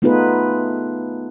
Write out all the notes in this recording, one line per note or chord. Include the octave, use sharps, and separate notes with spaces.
A3 B3 D#4 F4 G#4 B4